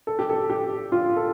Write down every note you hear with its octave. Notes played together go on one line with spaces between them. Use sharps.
A4
G4
A4
G4
F4
A4